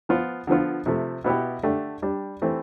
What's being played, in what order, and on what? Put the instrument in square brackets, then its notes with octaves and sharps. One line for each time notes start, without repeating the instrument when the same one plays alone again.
[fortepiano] F3 B3 F4
D3 F3 B3 F4
C3 F3 A3
B2 B3 E4 G4
D3 A3 D4 G4
G3 D4 G4
E3 A3 C4 E4 G4